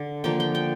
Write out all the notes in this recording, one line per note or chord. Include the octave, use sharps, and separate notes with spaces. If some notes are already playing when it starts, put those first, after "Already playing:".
Already playing: D3
D3 F3 A#3 G5
G5
G5